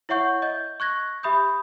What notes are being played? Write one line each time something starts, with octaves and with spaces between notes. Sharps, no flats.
E4 C#5 E5 F#5 C#6 G6
D#5 G6
C#6 F#6 G#6 A#6
G4 E5 B5 D#6 G6